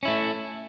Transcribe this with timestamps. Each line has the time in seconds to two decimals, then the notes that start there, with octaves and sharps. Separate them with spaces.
0.03 C#4
0.05 E4
0.08 A3